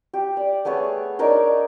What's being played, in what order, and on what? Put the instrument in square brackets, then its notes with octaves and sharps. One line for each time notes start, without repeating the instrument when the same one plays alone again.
[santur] G4
D5
A3 B3 G#4 C#5
D4 D#4 A#4 C#5